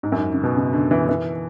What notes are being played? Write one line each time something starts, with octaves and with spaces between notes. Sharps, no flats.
G#2
F#2
G#2
C#3
B2
C#3
D3
E3
E3